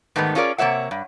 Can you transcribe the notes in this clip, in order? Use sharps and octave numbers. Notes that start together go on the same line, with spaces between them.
G#2 D#3 G3 A3 B3 D#4
C#4 F4 G#4 A#4 D5
C3 A#3 C#5 E5 F#5
G2